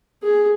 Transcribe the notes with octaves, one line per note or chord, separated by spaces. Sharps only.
G#4